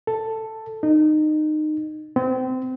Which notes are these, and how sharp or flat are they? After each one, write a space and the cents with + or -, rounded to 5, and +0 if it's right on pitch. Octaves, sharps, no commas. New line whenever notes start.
A4 +5
D#4 -25
C4 -30